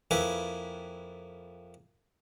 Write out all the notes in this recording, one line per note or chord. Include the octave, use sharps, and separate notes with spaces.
F2 A#3 E4 B4 G#5